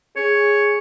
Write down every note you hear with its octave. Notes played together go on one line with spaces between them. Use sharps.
G#4 C#5